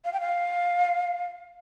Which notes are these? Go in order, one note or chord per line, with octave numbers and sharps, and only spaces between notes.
F5
G5
F5